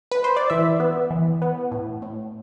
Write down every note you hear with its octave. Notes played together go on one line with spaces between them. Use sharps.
B4
C5
D5
E3 E5
B3
E3
B3
A2
A2